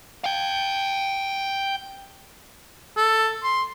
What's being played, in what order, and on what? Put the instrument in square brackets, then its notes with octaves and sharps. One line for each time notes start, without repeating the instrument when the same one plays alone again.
[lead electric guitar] F5 G5
[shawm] A4
C6